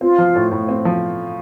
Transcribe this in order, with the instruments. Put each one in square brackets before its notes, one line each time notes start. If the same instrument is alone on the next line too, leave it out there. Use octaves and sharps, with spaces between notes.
[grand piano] C4 [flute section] F4
[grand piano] F3
A2
A2
C4
F3